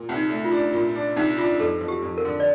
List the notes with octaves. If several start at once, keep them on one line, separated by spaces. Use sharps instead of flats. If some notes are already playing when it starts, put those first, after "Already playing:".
Already playing: A#2
C2
D#4
A3
F4
D4
A#2 F4
D4
C2 D#4
D4 F4
F2 A4
F2
G4
F2
A#4
D3
D5